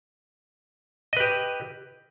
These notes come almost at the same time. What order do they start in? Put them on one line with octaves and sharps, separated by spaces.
D#5 B4 G4